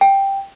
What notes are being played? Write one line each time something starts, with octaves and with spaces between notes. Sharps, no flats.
G5